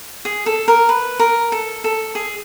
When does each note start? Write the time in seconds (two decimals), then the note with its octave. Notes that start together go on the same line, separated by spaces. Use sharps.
0.25 G#4
0.46 A4
0.68 A#4
0.89 B4
1.19 A#4
1.52 A4
1.84 A4
2.15 G#4